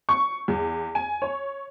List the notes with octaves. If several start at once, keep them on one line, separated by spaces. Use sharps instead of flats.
C#6
E2
G#5
C#5